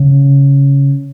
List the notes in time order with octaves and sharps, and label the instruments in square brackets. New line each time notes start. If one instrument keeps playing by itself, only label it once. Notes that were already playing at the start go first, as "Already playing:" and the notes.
Already playing: [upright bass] C#3